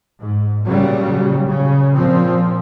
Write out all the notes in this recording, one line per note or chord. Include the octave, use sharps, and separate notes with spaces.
G#2
A#2 C#3 F#3 G3
C#3
A#2 F3 C4